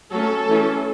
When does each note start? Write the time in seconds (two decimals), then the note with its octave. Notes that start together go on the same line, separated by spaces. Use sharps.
0.12 F#3 A3 C#4 A4
0.49 E3 A3 C#4